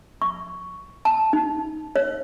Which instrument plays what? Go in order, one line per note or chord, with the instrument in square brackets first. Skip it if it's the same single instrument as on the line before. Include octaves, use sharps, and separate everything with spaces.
[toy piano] C#6
A5
D#4
C#5